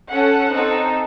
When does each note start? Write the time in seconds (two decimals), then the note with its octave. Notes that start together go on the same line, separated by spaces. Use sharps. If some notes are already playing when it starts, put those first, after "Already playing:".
0.10 C#4 A4 F#5
0.50 C4 D#4 A4